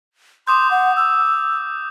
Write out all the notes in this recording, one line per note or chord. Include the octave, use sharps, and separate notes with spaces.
C6 D6 D#6 G6
F#5
E6